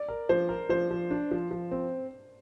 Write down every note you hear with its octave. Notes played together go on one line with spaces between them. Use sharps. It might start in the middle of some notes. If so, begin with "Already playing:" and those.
Already playing: D5
A#4
F3 C5
A#4
F3 C5
F3
D4
F3
F3
C4